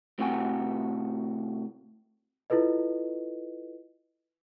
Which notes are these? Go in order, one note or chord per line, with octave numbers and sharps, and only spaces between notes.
A2 C3 F#4 G5 G#5
E4 F4 A4 B4 D#5